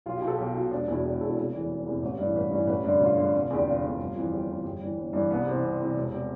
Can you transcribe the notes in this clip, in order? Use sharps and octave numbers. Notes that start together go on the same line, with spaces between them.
B1 F4
G4
B2
A4
B1 G4
B2
E1 D4
E2 B2 E4
E1 G4
E2 B2 A4
F1 A4
E2 C3 E3
F1
E2 C3 E3
A1
G2
E3
A1 B4
G2 E3
A1 B4
G2 D3
A1 F4
G2 D3
F1
E2 D3 G4
F1 F4
E2 D3
G1
F2 E3
G1 G4
F2 E3
G1 G4
G2 E3
G1
G2 E3
C2 B3
C3 E3 C4
C2
C3 E3
E1
C3